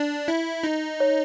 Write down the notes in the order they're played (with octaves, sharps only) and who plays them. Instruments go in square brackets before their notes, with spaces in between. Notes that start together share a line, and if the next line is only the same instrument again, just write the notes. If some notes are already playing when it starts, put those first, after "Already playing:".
Already playing: [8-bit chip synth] D4
E4
D#4
[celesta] C#5